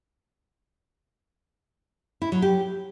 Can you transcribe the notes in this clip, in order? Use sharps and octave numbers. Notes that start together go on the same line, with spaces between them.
E4
F#3
G4